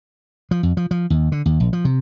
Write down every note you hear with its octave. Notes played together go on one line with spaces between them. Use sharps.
F3
F2
F3
F3
D#2
D3
D#2
A#1
F3
C3